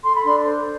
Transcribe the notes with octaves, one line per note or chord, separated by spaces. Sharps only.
A4 C6
B5
D4 C6
C5